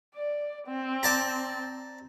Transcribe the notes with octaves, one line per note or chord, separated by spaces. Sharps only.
D5
C4
D5 A5 A#5